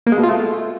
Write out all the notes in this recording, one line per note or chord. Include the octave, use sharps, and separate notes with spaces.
A#3
G#3
B2
F4
A3